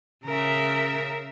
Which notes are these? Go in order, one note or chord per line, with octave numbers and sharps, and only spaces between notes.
C#3 A#4 E5